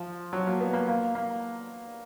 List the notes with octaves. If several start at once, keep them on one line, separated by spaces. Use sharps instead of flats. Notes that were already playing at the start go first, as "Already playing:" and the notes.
Already playing: F3
F#3
A#3
B3
A#3
A#3
A#3